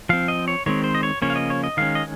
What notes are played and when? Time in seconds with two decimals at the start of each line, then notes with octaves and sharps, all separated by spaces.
0.09 F3 C4 F5
0.28 D#5
0.48 C#5
0.66 D#3 G#3 C4 C#5
0.84 C5
0.95 D#5
1.03 C#5
1.22 C#3 F3 A#3 C#4 C#5
1.30 F5
1.36 D#5
1.50 C#5
1.64 D#5
1.77 D#3 G#3 C#4 F5
1.95 D#5